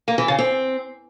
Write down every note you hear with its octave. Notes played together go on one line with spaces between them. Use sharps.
A#3
E3
C#3
C4